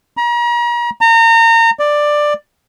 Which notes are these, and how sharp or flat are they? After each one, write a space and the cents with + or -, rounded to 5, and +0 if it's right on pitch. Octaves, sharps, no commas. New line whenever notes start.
A#5 +40
A#5 -30
D5 +10